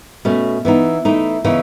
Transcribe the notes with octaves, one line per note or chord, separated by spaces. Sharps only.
B2 A3 C#4
E3 B3 D#4
E3 A3 D#4
C#3 E3 B3 D#4